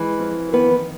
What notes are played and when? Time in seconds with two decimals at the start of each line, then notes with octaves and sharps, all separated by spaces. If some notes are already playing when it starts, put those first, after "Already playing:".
Already playing: E3 G#3
0.19 F2
0.53 D#3 B3 B4